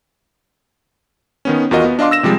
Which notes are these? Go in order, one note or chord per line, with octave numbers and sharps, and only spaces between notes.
D#3 B3 C#4
E2 F4 F#4 A#4 D#5
B3
D4 D#5 F5 C6 D6
E6 A#6 E7
C3 F3 G3 G#3